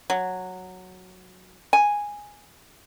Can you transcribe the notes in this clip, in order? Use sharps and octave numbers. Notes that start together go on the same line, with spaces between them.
F#3
G#5